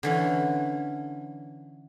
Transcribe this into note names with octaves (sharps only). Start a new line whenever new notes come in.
D3 E3 C#4